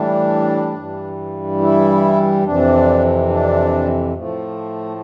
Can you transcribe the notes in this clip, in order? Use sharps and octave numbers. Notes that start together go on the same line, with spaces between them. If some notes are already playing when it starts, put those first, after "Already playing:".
Already playing: A2 E3 G3 D4
G2 E3 G3
E4
F2 C3 E3 D4
D4
A2 F3 A3